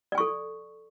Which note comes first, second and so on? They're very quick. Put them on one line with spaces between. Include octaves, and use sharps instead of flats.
D5 G#5 C#6 A4